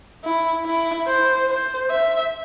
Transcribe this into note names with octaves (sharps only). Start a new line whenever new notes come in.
E4
E4
C5
C5
E5